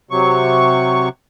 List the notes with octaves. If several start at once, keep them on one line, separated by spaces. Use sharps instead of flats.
C3 F#3 C#6